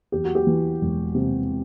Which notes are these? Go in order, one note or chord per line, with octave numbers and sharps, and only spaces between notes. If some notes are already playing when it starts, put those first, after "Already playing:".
E2 G4
F#4
G4
E3
E1
C3